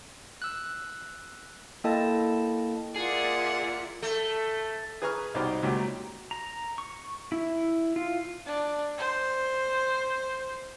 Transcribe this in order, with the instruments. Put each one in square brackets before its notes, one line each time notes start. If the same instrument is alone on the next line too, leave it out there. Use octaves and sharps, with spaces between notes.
[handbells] E6 F#6
A#3 E4 A4 D#5 G5 A5
[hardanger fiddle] A#3 F#5 [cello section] F4 D5 E5 [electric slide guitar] G#4
[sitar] A3
[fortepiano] G#4 B4 G#5 A#5 C#6 F6
C2 B2 D#4 G4 C5 F6
C#2 A#2 F#3 F#4 G4
[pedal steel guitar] A#5
C#6
E4
F4
[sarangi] D4
C5